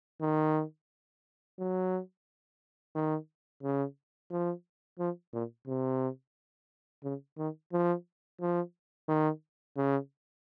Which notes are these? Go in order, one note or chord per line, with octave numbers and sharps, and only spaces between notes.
D#3
F#3
D#3
C#3
F3
F3
A#2
C3
C#3
D#3
F3
F3
D#3
C#3